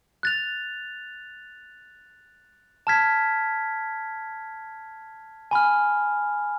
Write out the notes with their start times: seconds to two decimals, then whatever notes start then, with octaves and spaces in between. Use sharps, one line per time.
0.23 F#6 A6 F7
2.87 A5 F6 G#6 B6
5.51 G#5 B5 F6